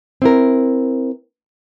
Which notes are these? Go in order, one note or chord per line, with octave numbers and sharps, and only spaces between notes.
C4 E4 A#4